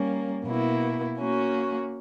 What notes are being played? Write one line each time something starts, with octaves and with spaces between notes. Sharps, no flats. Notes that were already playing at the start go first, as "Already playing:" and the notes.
Already playing: G3 A#3 C#4
B2 A#3 E4
A#3 C#4 F#4